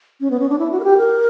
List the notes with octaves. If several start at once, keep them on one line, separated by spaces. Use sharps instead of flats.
C#4
B3
C#4
D4
E4
F#4
A#4
G4
A#4